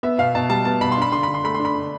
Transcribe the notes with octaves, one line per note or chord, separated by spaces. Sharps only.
B3 E5
B2 F5
B2 A5
G3 A5
B3 A5
B2 B5
C6
D4 B5
D3 C6
D3 B5
C6
A3 B5
C6
D4
B5
D3